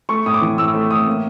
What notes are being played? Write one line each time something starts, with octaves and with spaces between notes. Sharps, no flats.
A3 C#6
A2 D#6
D6
E3
A2 E6
A3
A2 D#6
A#3